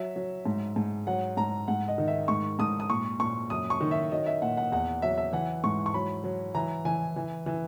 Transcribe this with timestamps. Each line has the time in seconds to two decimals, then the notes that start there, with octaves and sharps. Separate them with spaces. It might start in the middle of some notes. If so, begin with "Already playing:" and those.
Already playing: F#3 E5
0.16 F#3
0.46 G#2
0.76 G#2
1.07 F#3 F#5
1.37 G#2 A#5
1.68 G#2 F#5
1.88 D#5
1.98 D#3
2.08 E5
2.28 G#2 C#6
2.59 G#2 D#6
2.80 D#6
2.90 A#2 C#6
3.19 A#2 C#6
3.50 F#2 D#6
3.70 C#6
3.81 D#3
3.91 E5
4.11 F#3 D#5
4.26 E5
4.42 A#2 F#5
4.57 F#5
4.72 E2 F#5
5.02 F#3 E5
5.18 E5
5.33 E3 F#5
5.64 G#2 C#6
5.86 C#6
5.94 F#3 B5
6.24 F#3
6.55 E3 A#5
6.85 E3 G#5
7.16 E3
7.46 E3